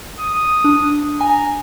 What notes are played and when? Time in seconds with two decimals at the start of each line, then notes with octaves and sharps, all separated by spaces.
0.20 D#6
0.64 D4
1.21 G#5 A#5